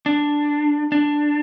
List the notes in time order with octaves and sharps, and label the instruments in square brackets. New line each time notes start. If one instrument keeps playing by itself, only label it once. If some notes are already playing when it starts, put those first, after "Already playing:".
[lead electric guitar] D4
D4